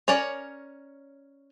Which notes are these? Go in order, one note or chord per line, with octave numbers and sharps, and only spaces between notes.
C#4 A#4 C#5 D5